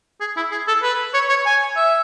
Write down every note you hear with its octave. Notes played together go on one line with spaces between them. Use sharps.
G#4
E4
G#4
A4
B4
C#5
C#5
G#5
E5